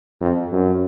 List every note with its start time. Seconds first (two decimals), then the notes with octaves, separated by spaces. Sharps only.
0.21 F2
0.52 F#2